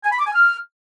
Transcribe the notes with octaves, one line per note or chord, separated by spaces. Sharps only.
G#5
B5
D6
G#5
F6